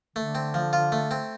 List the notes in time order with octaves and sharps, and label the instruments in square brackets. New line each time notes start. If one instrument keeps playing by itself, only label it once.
[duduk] D3 [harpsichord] A3
[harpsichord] C4
F3
F4
A3
C4